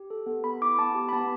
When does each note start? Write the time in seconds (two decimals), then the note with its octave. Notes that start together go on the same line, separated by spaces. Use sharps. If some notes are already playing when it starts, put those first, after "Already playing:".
Already playing: G4
0.10 A4
0.26 B3
0.44 B3 B5
0.62 E4 D6
0.78 B3 A5
0.95 G4
1.09 B5
1.13 B3 A5